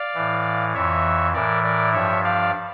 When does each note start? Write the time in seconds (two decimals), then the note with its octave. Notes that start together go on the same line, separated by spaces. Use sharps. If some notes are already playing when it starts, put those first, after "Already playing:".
Already playing: D5 F5
0.15 A2 E3
0.74 F2 E3 C#5 E5
1.34 A2 E3 A#4 D5
1.63 A#4 D5
1.93 G2 F3 C#5 E5
2.24 D5 F5